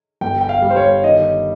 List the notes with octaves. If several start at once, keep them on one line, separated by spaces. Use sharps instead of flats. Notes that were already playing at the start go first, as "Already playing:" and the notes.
G1 G5
G5
F5
G3
C5
C#5
D#3 D#5